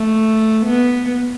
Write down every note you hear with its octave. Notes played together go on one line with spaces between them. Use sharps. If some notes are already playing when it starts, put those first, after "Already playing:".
Already playing: A3
B3